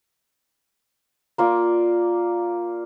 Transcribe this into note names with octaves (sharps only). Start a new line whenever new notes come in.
A#3 F4 D5